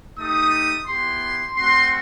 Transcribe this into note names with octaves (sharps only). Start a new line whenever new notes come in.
A3 D#4 G4 D#6
B3 E4 G4 C6
A3 C4 F#4 C6